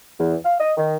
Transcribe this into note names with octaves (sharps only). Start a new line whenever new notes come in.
E2
F5
D#5
D#3